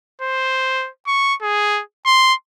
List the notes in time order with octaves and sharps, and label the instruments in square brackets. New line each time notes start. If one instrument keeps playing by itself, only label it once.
[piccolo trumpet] C5
C#6
G#4
C6